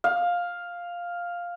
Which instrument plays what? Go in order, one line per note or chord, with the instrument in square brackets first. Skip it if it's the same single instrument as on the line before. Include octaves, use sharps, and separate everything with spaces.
[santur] F5